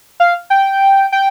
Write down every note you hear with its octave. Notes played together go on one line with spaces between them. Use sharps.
F5
G5
G5